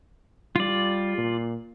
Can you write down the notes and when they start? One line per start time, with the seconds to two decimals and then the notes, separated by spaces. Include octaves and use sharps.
0.56 G3 F4 D5
1.18 A#2